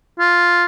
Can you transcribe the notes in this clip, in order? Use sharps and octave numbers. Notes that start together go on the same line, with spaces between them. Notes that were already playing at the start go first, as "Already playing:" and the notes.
F4